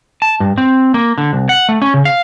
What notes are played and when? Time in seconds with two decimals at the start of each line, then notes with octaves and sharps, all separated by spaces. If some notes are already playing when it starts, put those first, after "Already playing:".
0.22 A5
0.40 G2
0.58 C4
0.94 A#3
1.18 D3
1.33 C2
1.49 F#5
1.69 A3
1.82 C#4
1.94 C#3
2.05 F5